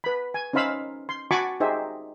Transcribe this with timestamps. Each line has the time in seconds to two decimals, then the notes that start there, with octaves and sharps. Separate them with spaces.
0.04 B4 B5
0.34 G#5
0.53 C#4 D#4 C5 F5 B5 E6
1.09 C6
1.31 F#4 G#5 A5 B5 C#6 D6
1.60 D#4 G4 G#4 C5 E5